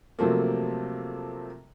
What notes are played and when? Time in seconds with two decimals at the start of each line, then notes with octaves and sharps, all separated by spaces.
0.19 C3 F3 F#3 A3 A#3